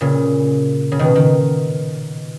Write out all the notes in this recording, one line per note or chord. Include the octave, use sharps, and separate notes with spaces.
A#2 C#3
C#3
B2 D#3
D#3